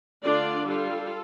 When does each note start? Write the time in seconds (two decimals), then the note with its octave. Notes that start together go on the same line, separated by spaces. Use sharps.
0.23 D3 A3 D4 F4 D5
0.66 G3 F4 A4